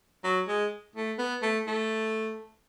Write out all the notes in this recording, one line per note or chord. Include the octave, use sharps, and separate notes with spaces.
F#3
G#3
A3
B3
A3
A3